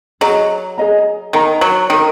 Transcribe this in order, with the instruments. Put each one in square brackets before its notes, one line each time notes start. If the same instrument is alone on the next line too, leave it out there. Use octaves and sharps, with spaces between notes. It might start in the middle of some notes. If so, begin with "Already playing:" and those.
[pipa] F#3 [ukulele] G#4 D#5 A#5
[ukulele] G#4 D#5 A#5
[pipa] D#3 [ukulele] A#4 D#5 A#5
[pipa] F#3
[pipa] D#3 [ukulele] A#4 D#5 A#5